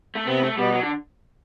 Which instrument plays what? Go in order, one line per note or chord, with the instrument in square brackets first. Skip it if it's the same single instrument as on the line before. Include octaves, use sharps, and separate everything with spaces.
[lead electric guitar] A3
[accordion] C3 C4 [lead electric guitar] B3
[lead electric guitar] A3
[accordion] B2 B3 [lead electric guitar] G3
[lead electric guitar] F#3
D3